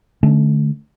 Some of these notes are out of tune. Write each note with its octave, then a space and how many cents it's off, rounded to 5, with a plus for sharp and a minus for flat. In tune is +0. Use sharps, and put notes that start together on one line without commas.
D3 +15 A3 -25 C#4 +0